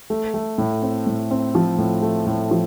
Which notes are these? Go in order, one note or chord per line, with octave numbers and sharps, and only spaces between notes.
A3
A3
A2
C4
A2
C4
F3
A2
A3
A2
F3